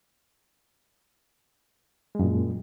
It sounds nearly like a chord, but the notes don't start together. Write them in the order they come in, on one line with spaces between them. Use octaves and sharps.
G#3 F#2 A#2